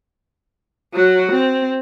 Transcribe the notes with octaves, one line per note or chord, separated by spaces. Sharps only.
F#3 F#4
C4